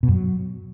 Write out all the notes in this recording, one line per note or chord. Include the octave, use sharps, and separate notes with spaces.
B2
F#2
F#3